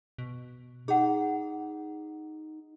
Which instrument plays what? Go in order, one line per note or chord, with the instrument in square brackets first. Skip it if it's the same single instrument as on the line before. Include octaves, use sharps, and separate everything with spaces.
[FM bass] B2
[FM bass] D#4 [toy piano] G#4 F#5